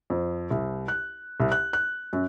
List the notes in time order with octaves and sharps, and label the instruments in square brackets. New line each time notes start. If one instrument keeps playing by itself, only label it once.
[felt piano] F2
C2
F#6
C2
F#6
F#6
F#2